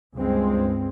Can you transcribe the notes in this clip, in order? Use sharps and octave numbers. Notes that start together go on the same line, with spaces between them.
C#2 G2 G#3 C4